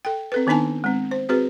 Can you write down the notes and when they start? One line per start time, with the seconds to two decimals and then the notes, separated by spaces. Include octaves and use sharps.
0.05 A4 G5
0.32 C4 A4 B4
0.47 D#3 B3 D4 D#4 G#5 A5
0.84 G#3 C4
1.11 C5
1.29 C4 F#4 G#4 B4